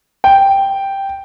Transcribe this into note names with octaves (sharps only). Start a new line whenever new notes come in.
G5